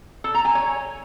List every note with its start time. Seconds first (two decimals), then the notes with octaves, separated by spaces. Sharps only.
0.24 A4
0.34 A#5
0.45 G#5
0.55 C#5